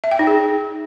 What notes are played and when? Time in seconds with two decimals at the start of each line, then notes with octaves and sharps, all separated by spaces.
0.04 E5
0.11 G5
0.19 D#4
0.27 G#4